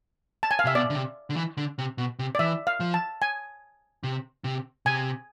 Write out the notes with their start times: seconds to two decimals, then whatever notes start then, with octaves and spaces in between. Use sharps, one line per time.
0.43 A5
0.51 G#5
0.59 F5
0.65 C3 E5
0.75 B2 D5
0.90 D3
0.95 C3
1.30 D3
1.36 E3
1.57 D3
1.78 C3
1.98 B2
2.19 C3
2.35 D5
2.39 E3 E5
2.67 F5
2.80 F3
2.94 A5
3.22 G#5
4.04 C3
4.44 C3
4.86 C3 G#5